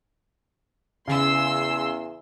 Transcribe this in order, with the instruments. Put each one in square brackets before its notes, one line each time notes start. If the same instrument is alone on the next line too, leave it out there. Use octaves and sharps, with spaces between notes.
[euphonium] E2 [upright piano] C#3 [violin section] C6 E6